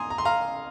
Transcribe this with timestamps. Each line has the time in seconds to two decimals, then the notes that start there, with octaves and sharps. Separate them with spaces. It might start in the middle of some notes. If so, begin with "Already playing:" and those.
Already playing: G#5 A#5 C6 D#6
0.10 A#5
0.18 C6
0.25 F5 A#5